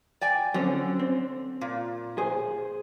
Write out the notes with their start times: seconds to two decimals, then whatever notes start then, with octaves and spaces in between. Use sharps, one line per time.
0.21 D5 G5 G#5
0.54 D3 F#3 C4 C#4
1.00 C4
1.61 A#2
2.18 G#4 C5